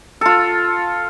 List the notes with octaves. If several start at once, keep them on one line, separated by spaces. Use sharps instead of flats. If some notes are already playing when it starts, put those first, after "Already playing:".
F4 A4